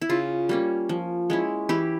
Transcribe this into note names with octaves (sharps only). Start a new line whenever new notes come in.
E4
C#3 F4
G3 A#3 C#4
F3
G#3 C#4 E4
E3 E4 G4